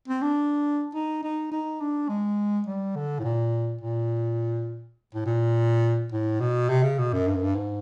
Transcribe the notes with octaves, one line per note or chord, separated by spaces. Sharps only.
C4
D4
D#4
D#4
D#4
D4
G#3
G3
D3
A2
A#2
A#2
A2
A#2
A2
B2
C3
C#3
B2
F#2
G2
F#2
G2
G#2